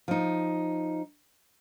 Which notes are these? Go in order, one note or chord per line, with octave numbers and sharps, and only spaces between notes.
F3 D#4